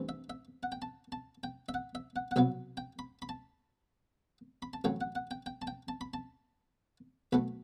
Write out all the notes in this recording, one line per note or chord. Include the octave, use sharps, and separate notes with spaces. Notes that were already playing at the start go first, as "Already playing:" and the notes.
Already playing: G2 E3 A3 C4
E5
E5
F#5
G5
A5
A5
G5
E5
F#5
E5
F#5
F#5
C2 B2 F#3 B3 E5
G5
B5
B5
A5
B5
A5
A1 A2 F#3 A3 G5
F#5
F#5
G5
G5
A5
G5
A5
B5
A5
B1 B2 A3 B5